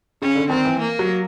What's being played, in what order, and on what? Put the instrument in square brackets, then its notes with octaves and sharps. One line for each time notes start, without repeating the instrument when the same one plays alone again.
[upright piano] C#3 [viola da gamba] C#4
[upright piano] D3
[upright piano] D#3 [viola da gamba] C4
[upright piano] E3
[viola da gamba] A#3
[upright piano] F#3